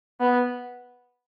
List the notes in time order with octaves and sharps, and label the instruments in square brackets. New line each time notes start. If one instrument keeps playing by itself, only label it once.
[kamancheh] B3